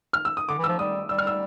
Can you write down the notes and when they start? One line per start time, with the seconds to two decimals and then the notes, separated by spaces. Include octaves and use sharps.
0.13 F6
0.25 E6
0.37 D#6
0.49 D3 D6
0.58 E3
0.64 F3 E6
0.79 G3 D#6
1.09 G3 E6
1.18 F6
1.27 E6